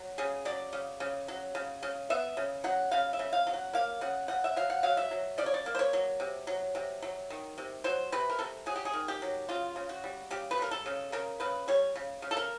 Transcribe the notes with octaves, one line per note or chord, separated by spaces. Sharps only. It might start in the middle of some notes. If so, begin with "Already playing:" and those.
Already playing: F#3
C#3 G#4
F#3 D5
C#3
C#3
F#3
C#3
C#3
B3 E5
C#3
F#3 F#5
C#3 F5
E5
C#3
F5
F#3
F#5
A#3 F5
C#3 F#5
C#3 F#5
E5
F#3 F5
F#5
F#3 F5
E5
F#3
C#3 D5
C#5
D5
A#3
C5
C#5
F#3
C3
F#3
C3
F#3
D#3
C3
F#3 C5
C3 B4
A#4
C3 A4
F#3 G#4
G4
G#4
D#3
G4
F#3
C#3 F4
C#3
F#4
G3
C#3 G4
B4
G3 A#4
A4
C#3
C#3 A#4
C#3 B4
G3 C#5
C#3
C#3
A4
A#4